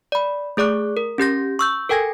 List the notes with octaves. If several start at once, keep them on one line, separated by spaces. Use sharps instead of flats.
D5 B5
A3 G#4 D5 D6 F#6
A#4
C#4 G4 G6 A#6
C#6 E6 G6
A4 A#4 G5 G#5 G#6 A#6